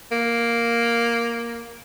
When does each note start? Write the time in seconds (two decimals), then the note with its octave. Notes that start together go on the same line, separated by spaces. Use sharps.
0.11 A#3